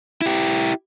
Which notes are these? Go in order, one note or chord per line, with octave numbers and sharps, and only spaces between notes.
E4 G4